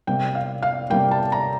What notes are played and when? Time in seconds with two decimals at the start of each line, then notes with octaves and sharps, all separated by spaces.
0.07 C3 G3 A#3 G5
0.35 F5
0.63 F5
0.90 C3 G3 A#3 G5
1.11 A5
1.32 A#5